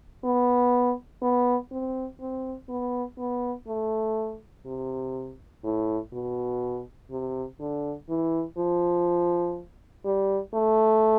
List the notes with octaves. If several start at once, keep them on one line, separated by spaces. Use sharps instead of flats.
B3
B3
C4
C4
B3
B3
A3
C3
A2
B2
C3
D3
E3
F3
G3
A3